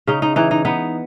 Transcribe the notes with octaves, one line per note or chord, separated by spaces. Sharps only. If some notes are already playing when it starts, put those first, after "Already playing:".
C#3 D#4
D#4
E3 D#4
D#4
B3 D#4